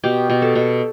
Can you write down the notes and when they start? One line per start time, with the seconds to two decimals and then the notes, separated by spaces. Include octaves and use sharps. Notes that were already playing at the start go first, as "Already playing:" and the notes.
0.04 B2 G4
0.30 B2
0.42 A4
0.55 B2